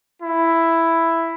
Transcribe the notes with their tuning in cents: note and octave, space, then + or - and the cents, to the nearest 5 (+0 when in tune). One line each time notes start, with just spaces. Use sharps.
E4 +5